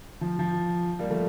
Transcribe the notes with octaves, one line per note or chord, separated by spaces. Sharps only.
F3
F3
G3 A#3
F3 A3